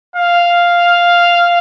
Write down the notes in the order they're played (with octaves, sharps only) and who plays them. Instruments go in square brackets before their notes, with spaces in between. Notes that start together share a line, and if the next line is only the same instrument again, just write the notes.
[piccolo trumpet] F5